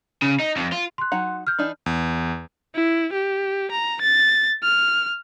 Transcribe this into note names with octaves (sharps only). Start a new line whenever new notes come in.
C#3
D#4
F2
F4
C6 F#6
F#3 D#4 F#5
F6 G6
E3 D4 D#4
E2
E4
G4
A#5
A6
F6